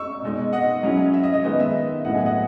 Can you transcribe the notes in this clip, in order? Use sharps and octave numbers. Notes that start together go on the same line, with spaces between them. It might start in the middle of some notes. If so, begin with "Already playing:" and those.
Already playing: C#6 E6
B2 G#3 D#4
D#5 F#5
F#3 C#4 E4
E5
D#5
D#5
D#3 G#3 B3 D#4 D#5
E5
A2 F#3 B3 E4 D#5 F#5
E5 G#5
D#5 F#5